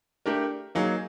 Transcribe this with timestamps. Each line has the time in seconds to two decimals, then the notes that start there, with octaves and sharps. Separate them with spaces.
0.26 A3 D4 G4 A#4
0.75 F#3 A#3 D#4 G#4